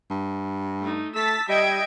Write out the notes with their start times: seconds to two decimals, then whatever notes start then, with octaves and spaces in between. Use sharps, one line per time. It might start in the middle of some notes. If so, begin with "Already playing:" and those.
0.10 G2
0.81 A3 D#4
1.15 A3 A5 E6 A6 B6
1.49 G3 D#5 E5 G5 G#6 D7